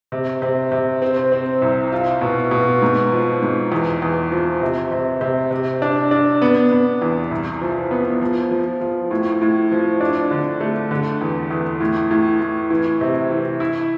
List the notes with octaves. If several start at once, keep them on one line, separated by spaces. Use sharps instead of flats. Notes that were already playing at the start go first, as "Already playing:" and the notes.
C3
C3
C3
C4
C4
C2
F4
B2
B2
G#2
F3
G#2
E2
E2
F3
C3
C3
C3
C3
D4
D4
B3
B3
E2
C2
F3
B3
F3
F3
F3
A2
A2
F3
D4
D3
A3
D3
E2
E2
A2
A2
A2
E3
C3
E3
E4